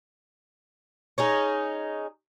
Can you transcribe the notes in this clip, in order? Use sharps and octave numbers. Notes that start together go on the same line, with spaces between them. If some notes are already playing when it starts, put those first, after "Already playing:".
C#4 D#4 G#4